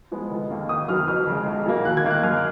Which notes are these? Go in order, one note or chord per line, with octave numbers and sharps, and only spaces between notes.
F3 G#3 B3
F1
D#2 D#3 A#3
G#1 D#6
F#2 D#3 F#3 B3 F6
F2 F6
C#3 G#3
B1
A#2 F#3 A#3
D#2 F#6
G#6
D#3 A#3
F#6
F#2 F6